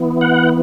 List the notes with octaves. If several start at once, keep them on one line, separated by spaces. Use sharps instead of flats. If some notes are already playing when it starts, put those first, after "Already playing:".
Already playing: E3 B3
F#5